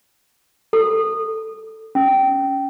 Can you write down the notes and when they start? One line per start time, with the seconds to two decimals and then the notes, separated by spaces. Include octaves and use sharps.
0.73 A4
1.95 C#4